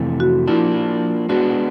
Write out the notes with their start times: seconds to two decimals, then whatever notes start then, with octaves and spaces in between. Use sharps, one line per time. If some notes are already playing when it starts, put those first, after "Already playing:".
Already playing: F2 C3 E3 A3
0.20 F#4
0.48 F3 A#3 D4 E4
1.29 G#3 B3 D4 F#4